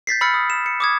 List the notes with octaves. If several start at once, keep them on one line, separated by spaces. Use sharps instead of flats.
G6 A6 B6 C7
B5 E6 F6 A6 C#7
D#6
E7
C#7
D6 D#6 G#6